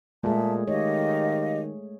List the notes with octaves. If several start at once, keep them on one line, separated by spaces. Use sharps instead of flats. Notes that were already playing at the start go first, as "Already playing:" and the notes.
A#2 G#3 A3 G#4 E5 A5
D#3 G4 C#5 D#5 F5